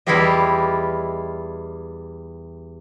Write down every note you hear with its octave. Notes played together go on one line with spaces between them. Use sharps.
E2 G3 E4 F4 G4 D#5